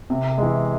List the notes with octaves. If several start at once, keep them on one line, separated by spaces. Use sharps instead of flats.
C3
E3 G#3